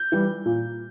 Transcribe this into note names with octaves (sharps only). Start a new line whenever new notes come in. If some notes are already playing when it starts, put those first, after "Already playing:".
Already playing: G6
E3 G3
A#2